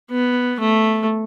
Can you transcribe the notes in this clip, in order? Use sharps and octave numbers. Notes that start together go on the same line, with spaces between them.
B3
A3